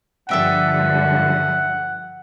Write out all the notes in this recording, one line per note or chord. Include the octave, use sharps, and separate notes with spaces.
G2 D3 F3 A4 E5 F#5 G5